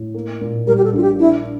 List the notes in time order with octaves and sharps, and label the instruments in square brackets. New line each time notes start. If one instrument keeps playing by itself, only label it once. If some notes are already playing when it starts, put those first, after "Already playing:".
Already playing: [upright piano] A2
A#3
A#2
[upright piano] G3 [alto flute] A#4
[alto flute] G4
A4
[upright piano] A#1 [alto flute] F4
[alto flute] G4
[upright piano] D4 [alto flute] E4